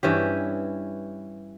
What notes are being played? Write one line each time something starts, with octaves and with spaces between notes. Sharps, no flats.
G2 E3 C#4 G4